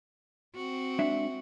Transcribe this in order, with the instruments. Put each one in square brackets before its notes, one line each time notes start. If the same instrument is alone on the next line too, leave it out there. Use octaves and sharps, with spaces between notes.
[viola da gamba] C4 F#4
[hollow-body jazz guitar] G#3 D4 E5